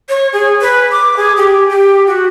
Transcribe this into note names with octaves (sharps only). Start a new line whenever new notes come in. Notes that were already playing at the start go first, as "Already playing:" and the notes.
C#5
G#4
B4
D6
G#4
G4
G4
F#4